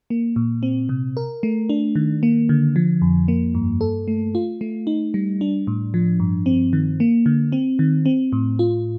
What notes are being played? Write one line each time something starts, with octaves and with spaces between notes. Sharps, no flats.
A#3
A#2
C4
C3
A#4
A3
D4
D#3
A#3
D3
F3
F2
A#3
G2
A4
A3
F4
A3
D#4
G3
D4
A2
F3
G2
C4
D#3
A#3
D3
C4
D#3
C4
A2
F4